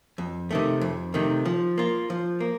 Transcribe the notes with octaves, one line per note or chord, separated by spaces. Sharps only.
F2
C3 D#3 A3
F2
C3 D#3 A3
F3
A#3 F4
F3
A#3